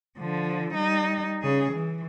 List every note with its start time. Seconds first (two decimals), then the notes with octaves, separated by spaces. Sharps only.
0.18 D3 F3
0.74 G3 D#4
1.43 C#3 G#4
1.72 E3